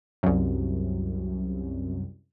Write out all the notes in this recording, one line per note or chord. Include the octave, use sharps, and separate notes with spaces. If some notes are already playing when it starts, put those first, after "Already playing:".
C2 F#2